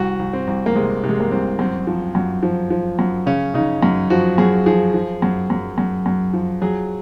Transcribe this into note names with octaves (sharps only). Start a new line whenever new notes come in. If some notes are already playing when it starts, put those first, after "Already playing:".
Already playing: C2 F#4
C2
C4
C2
A#3
C3 G#3
C3
G#3
A#3
C2 C4
F#2 C4
F3
F#2
F3
F3
F#2
C#3 C#4
C#3 D#4
F#2
F3 F#4
F#2 G#4
F3 G#4
F3
F#2
F#2
F#2
F#2
F3
F#3 G#4